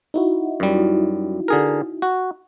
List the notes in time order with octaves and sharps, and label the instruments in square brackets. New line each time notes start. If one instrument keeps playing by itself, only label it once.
[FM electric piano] D#4 E4 F#4
[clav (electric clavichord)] F#2 G3
D3 G#4 A#4
F#4